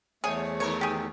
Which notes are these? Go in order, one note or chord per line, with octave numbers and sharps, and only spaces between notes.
E2 G3 A3 G#4 C5 C#5
C3 D#3 A#4 C#5
G4 G#4